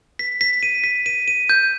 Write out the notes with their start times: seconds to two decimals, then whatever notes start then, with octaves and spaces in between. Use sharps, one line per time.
0.19 B6
0.41 B6
0.63 D#7
0.84 B6
1.06 D#7
1.28 D#7
1.50 G6